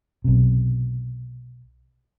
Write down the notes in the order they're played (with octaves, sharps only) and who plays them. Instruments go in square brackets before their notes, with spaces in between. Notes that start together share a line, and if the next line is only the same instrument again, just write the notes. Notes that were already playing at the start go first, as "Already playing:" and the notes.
[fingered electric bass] B1 C3